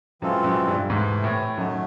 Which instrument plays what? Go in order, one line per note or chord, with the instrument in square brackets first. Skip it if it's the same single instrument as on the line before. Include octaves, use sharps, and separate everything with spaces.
[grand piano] F#2 [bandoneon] E3 G#3 C4 F4 A4
[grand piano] F#2
G2
[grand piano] G#2 [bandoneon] C3 E3 A3
[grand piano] A2
[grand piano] F#2 [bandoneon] D#3 F#3 A3